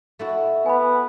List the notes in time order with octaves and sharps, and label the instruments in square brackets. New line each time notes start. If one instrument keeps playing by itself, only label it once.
[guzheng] A3 E4 F#4
[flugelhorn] B3 [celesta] G#5 B5